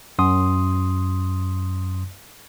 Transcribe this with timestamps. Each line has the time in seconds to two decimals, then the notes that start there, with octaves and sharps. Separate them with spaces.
0.19 F#2 C6 D#6